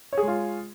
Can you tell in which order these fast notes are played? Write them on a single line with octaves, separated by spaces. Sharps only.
C#5 G#4 G#3 F4